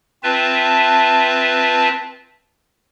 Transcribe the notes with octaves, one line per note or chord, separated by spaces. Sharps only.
C4 F4 B4 E5 A5